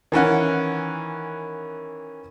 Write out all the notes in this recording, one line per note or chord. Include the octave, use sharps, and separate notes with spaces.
D#3 E3 C#4 F#5